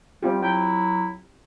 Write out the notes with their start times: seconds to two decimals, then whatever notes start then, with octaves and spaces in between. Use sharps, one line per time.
0.23 G3 C4 F4 G4
0.43 F#3 E4 G5